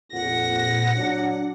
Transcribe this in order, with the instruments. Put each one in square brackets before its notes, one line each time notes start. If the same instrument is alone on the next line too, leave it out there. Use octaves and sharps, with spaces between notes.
[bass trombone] F2 [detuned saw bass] A#2 [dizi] F#5 [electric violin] A#6
[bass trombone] F#3 [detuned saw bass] D4